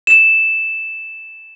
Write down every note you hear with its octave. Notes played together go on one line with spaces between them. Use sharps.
E7